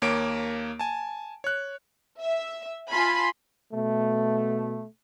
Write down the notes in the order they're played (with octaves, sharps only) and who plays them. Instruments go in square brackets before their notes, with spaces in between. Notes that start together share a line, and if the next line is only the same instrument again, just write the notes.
[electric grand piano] D#2 A#3 C#5 D6 D7
G#5 A5
C#5 F#6
[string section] E5
F4 G#5 A5 B5 C6
[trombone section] B2 A3